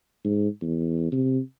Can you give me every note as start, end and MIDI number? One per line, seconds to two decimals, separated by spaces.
0.24 0.48 44
0.62 1.09 40
1.12 1.39 48